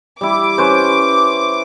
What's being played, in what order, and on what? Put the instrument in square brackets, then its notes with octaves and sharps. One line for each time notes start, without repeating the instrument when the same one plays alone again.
[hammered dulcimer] G3 E4 [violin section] D6
[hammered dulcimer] C#4 B4 C5